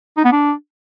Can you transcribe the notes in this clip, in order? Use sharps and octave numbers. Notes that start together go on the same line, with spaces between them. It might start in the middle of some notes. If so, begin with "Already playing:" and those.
D#4
B3
D4